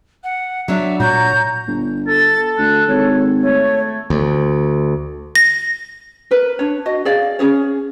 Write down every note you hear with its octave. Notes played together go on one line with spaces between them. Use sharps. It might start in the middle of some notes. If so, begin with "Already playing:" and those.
F#5
F#3 D4 E5
A#2 F#4 C#5 A#5 G6
G1
A4 A6
D2 F#6
G#1 C#5
A3 C#5
D2
A#6
A#4 B4
D4 C#5
F#4 D#5
G#4 D5 F5
C#4 F#4 G#4 C#5